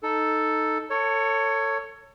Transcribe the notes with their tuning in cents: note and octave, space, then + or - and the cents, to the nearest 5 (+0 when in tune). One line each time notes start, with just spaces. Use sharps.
D#4 +0 A4 +0
A4 +30 C#5 +0